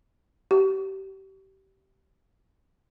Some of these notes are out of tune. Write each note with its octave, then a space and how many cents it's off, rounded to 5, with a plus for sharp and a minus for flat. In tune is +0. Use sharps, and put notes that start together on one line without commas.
G4 -25